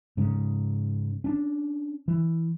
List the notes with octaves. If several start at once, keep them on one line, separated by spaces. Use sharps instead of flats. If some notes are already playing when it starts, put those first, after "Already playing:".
G#2 C#3
C#4 D4
E3